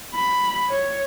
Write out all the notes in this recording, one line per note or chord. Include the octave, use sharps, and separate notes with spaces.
B5
C#5